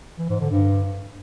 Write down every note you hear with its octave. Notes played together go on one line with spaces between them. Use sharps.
E3
G#2
D3
G2